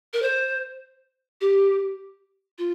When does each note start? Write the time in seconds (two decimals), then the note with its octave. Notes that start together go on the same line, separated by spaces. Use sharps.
0.13 A#4
0.22 C5
1.41 G4
2.58 F4